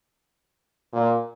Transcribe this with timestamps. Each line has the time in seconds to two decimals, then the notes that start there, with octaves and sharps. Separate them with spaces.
0.93 A#2